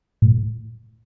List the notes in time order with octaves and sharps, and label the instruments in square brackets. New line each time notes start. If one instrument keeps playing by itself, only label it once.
[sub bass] A2